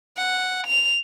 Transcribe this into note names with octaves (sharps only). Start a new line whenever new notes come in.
F#5
F7